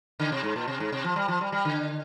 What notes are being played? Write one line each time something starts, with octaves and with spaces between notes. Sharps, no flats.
D3
C3
G#2
A#2
C3
G#2
C3
F3
G3
F3
G3
G3
D3